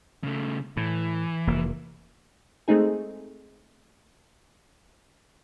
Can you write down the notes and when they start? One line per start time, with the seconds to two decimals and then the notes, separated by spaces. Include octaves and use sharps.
0.24 C#3 A3
0.77 A2 E3
1.47 F1 A#3
2.68 G#3 A3 C4 D#4 G#4